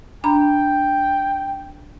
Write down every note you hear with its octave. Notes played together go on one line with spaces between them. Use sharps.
D4 G5 A#5 B5